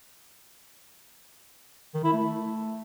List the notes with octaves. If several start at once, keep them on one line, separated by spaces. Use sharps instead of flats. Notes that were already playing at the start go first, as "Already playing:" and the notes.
D#3
E4
A3